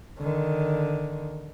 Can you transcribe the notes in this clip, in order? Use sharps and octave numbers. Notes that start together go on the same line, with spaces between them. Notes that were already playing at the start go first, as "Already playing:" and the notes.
D3 D#3